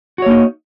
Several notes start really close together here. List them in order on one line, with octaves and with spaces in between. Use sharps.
F#4 C#5 A#3 D#4